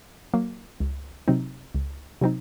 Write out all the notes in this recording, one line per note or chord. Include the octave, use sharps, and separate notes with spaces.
F#3 A#3
C#2
C3 F#3 C4 D#4
C#2
C3 F#3 C4 D#4